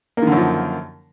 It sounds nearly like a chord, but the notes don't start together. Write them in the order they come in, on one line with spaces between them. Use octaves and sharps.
A#3 D#3 D3 F#2 F3